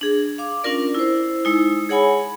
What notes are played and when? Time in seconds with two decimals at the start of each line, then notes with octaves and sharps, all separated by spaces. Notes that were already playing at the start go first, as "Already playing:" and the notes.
0.01 D4 G#4
0.38 F5 D6
0.64 C#4 D4 F4 A#4 D5
0.95 E4 C5
1.45 G#3 D#4 E4
1.89 G#4 C#5 F#5 G#5 B5